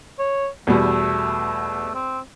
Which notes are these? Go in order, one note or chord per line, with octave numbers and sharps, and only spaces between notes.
C#5
E2 B2 G3 A3
C4